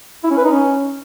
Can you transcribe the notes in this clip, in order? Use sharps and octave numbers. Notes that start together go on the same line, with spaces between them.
E4
C#4
B4
D#4
C#4